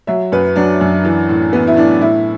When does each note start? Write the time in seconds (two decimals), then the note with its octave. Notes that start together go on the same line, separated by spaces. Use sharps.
0.07 F#3 E5
0.32 F#2 B4
0.56 F#3 D4
0.81 F#2
1.05 E3
1.29 A2
1.53 E3 B3
1.67 E4
1.76 A2 D4
2.01 A2 E4